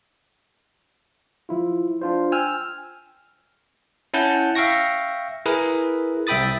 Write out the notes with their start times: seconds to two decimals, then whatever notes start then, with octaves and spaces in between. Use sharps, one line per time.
1.49 F3 E4 F4
2.01 D4 F4 C5
2.32 G5 G#5 E6 F6 G6
4.14 C#4 E4 F#5 A5 G6
4.55 E5 F5 G5 C#6 A#6
5.46 E4 G#4 A#4 B4
6.27 C2 E5 G5 B5 D#6 A6